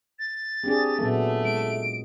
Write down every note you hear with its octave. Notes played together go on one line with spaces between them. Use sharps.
A6
C4 D4 G4 G#4
A#2 F#3 A3 B3
G#3 D7